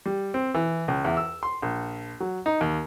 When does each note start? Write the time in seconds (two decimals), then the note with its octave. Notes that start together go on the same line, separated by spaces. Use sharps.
0.06 G3
0.34 C4
0.54 E3
0.88 C#2
1.05 E2
1.17 E6
1.43 C6
1.62 A#1
2.20 F#3
2.46 D#4
2.61 D#2